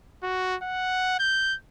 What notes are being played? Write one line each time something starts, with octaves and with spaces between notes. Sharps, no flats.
F#4
F#5
G6